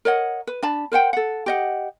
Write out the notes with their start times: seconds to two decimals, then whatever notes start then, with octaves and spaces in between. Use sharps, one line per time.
0.05 A#4 C#5 D#5 F#5
0.47 B4
0.62 D4 A5 B5
0.92 A#4 C5 F#5 G5
1.13 A4 F#5
1.46 G4 D#5 F#5